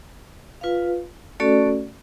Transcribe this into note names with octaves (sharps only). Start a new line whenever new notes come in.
F4 B4 F5
A3 C#4 F#4 A4 D5